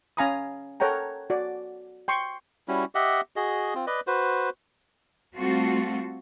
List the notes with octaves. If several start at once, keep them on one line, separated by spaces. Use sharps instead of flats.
C#4 F5 G#5 A#5 B5 D#6
A4 A#4 C#5 F#5 G5 A#5
F#4 D5
G5 C6 C#6
G3 C#4 E4 F#4
G4 D#5 E5 F#5
F#4 G#4 D#5
C4 F4
B4 D5 D#5
F#4 B4 C5
G3 A3 C4 F4 F#4 A4